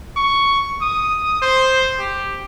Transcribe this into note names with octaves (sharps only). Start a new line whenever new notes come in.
C#6
D#6
C5
G4